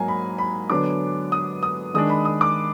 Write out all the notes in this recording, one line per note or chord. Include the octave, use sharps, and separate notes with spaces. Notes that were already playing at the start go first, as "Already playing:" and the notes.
Already playing: G#2 F#3 A#3 G#5 A#5
B5
B5
D3 F#3 B3 D4 D6
D#6
D#6
D#3 G#3 D4 D#6
B5
D#6
D6